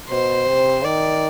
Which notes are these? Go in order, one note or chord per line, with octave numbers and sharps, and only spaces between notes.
B2 C5
C3
D#3 D5